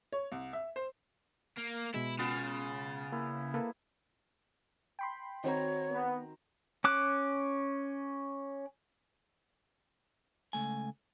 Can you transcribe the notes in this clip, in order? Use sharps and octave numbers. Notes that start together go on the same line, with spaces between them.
C#5
C2
E5
C5
A#3
B2 G#3 E4
C#3 B3 F4
A#3 E4
A#3 A4 B4
G5 B5 C6
D#3 C4 D#4 F#4 C#5 A#5
B3
C#4 D6 F#6
C#2 A3 G#5